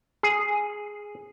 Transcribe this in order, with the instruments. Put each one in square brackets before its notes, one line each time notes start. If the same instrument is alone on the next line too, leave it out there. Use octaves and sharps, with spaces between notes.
[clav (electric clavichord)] G#4